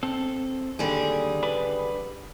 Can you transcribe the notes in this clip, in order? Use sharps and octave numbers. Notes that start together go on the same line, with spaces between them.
C4 A4
D#2 D3 G3 G#4
D4 B4 B5